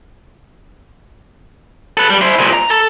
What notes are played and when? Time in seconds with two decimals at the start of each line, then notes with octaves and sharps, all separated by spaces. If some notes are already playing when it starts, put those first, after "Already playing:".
1.97 A4 B4
2.10 G3
2.21 E4 C5
2.39 C2 A#2
2.53 A#5
2.70 A4